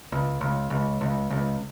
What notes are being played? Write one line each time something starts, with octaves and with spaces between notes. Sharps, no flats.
C#2
C#2
C#2
C#2
C#2